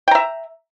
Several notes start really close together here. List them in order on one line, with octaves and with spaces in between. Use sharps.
G5 A#5 E5